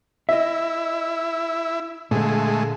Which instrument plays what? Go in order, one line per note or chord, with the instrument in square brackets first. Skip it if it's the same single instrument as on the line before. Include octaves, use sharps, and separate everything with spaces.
[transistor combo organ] E4 [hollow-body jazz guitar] D#5 E5
[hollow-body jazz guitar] A#2 D3 [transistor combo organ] G#3 A3